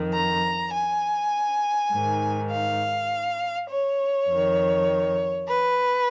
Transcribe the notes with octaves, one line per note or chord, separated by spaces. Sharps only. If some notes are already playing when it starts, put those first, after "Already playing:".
Already playing: F2 D#3
A#5
G#5
G#2 D#3
F5
C#5
F2 D#3
B4